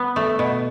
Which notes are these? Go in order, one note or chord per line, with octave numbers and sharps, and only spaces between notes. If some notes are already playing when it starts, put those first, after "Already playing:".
Already playing: B3
A3
B2